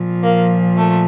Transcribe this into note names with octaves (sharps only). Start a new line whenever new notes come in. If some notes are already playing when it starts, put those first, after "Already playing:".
Already playing: A#2 F3
A#3
A3